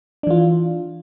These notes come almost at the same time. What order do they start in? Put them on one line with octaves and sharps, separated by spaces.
D4 E3 F4